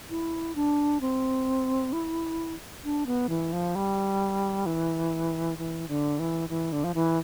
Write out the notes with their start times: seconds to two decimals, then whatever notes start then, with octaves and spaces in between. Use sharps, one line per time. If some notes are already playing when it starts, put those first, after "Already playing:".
0.10 E4
0.55 D4
1.01 C4
1.93 E4
2.84 D4
3.06 B3
3.29 E3
3.53 F3
3.75 G3
4.66 E3
5.58 E3
5.89 D3
6.19 E3
6.49 E3
6.72 D3
6.84 F3
6.95 E3